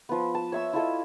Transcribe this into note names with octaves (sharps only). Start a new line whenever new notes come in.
F3 B3
A5
C#5 E5 E6
E4 F4 A4 D#5